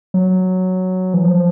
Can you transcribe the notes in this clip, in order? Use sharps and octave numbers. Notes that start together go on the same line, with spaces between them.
F#3
E3
F3